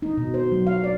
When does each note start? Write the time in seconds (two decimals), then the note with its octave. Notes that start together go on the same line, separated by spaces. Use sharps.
0.02 D#4
0.17 B2
0.34 C5
0.52 F#3
0.67 F5
0.84 D5